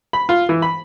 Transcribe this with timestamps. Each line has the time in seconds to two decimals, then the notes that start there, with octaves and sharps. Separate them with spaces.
0.13 B5
0.29 F4
0.49 E3
0.62 B5